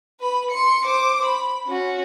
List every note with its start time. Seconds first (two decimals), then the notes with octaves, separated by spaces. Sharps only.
0.21 B4 B5
0.51 C6 C#7
0.85 C5 D6
1.25 B5
1.67 C#4 F#4